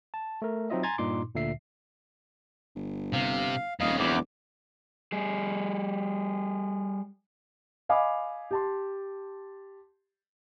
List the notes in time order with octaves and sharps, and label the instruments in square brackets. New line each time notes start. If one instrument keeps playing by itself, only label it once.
[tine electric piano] A5
A3 A#4
F#3 C4 D#4 F4 D#5 E5
G#5 A#5 C6 G#6 A6
G2 A#2 D#4 C6 D6
D2 A#2 D3 E5 C7
[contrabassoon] G1
[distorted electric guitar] C3 [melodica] F5
[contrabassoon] D#1 [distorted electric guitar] F2 C#3 [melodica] D#5 F5
[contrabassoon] E1 [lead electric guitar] E2 [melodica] D6
[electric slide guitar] G3 G#4
[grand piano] D#5 F5 G#5 B5 D6
G4 A5 C6